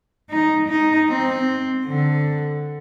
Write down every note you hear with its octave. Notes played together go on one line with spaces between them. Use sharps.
D#4
D#4
C4
D3